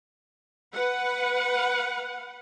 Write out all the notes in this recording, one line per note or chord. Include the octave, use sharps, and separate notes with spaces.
B4 F#5